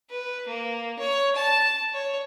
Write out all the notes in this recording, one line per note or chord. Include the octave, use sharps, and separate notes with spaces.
B4
A#3
C#5
A5
C#5